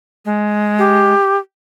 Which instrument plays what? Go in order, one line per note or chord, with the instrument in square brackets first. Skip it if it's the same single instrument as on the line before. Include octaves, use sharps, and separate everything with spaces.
[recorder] G#3
[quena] G4